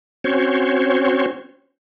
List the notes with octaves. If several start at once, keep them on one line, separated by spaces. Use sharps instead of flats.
C4 C#4 F#4 C5 C#5